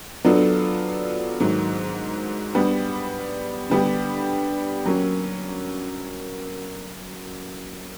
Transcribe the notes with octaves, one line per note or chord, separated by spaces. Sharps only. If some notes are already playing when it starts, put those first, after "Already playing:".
F#3 B3 D4 F4 A4
G#2 D#3 F#3
G3 B3 D4
D3 G3 B3 D4 G4
F#3 A#3 C#4